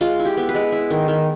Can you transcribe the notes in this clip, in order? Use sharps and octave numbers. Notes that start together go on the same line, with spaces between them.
G#3 F4
E4
G4
B3
B4
G#3
E4
D#3
D#3